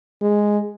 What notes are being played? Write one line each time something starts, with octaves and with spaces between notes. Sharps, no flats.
G#3